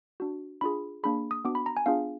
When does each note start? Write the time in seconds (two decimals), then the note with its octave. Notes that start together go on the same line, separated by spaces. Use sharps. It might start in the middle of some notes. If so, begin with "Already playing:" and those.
0.20 D4 F#4
0.61 D4 F4 G#4 B5
1.03 A#3 D4 G#4 B5
1.31 D#6
1.45 B3 D4 F#4 D6
1.55 B5
1.66 A#5
1.77 G#5
1.86 B3 D4 F4 G#4 F5